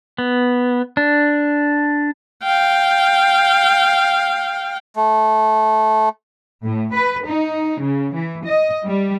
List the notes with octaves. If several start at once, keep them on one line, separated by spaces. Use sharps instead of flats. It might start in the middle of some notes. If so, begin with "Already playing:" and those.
B3
D4
F5 G5
A3
A2
B4
D#4
C#3
E3
D#5
G3